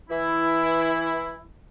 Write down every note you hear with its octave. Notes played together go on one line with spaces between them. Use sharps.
E3 E4